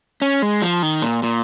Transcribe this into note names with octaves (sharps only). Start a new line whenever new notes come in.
C#4
G#3
F3
D#3
A#2
A#2